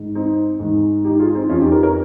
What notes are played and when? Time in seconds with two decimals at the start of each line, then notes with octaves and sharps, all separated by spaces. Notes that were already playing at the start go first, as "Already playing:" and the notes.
Already playing: G#2 D#3
0.15 C4 D#4
0.60 G#2 D#3
1.05 D#4 G4
1.19 F4 G#4
1.35 C4 D#4
1.49 F2 D#3 C#4 F4
1.61 D#4 G4
1.71 G4 A#4
1.83 A#4 C#5